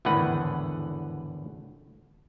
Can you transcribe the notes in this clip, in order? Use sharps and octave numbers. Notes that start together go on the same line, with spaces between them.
G#1 E2 A2 D3 B4 F#5